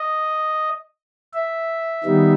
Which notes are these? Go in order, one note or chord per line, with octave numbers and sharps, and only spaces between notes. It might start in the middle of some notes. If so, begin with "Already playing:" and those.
Already playing: D#5
E5
D#3 G3 B3 D#4